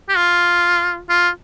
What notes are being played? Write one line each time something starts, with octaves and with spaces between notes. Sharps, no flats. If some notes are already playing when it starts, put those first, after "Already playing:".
G4
F4
F4